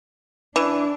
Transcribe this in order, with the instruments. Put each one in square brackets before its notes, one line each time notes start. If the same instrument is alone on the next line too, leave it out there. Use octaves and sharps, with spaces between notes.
[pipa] E3 [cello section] D4